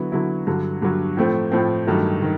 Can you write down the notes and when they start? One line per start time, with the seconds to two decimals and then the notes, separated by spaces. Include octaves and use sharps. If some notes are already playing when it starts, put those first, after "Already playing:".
Already playing: D3 F#3 B3 E4
0.12 D3 F#3 B3 E4
0.47 G2 D3 F#3
0.82 G2 D3 F#3
1.17 A2 F3 A3 C4
1.52 A2 F3 A3 C4
1.87 G2 D#3 F#3 A3
2.22 D#3